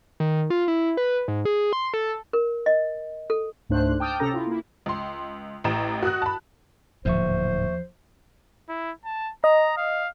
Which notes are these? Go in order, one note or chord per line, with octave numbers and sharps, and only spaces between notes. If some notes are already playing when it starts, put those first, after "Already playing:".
D#3
F4
E4
B4
G#2
G#4
C6
A4
A#4
D#5
A4
C#2 G#2 A3 D4 C5 F#6
G5 A5 D6 D#6 F6 G6
C3 C#4 G4 A4 A#5 A#6
E4 F4
A#3 E4
C#2 C6
A1 A2 A#5 E7
F#4 F#5 D#6 F#6
A5 B5
D1 D#2 G#2 F3 C5 E5 C#6
E4
A5
D#5 A#5
F5